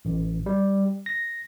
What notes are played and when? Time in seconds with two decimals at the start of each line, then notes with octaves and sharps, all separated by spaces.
0.05 A1
0.46 G3
1.06 A#6